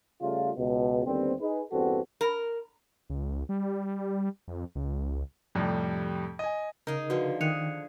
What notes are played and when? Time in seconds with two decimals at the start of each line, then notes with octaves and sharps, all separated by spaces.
0.21 C#3 G3 A3 F4
0.57 C#2 B2
1.06 D#2 D3 G3 B3 C4
1.40 D#4 G#4 B4
1.71 E2 G2 B3 C4 F#4 A4
2.21 A#4
3.10 C#2
3.49 G3
4.48 F2
4.75 C#2
5.55 F2 A2 C3 G3
6.39 D#5 G#5
6.87 C#3 D#4 G#4 A#4
7.10 D3 F3 F#4 B4
7.41 D#3 G#4 F#6 C#7 F7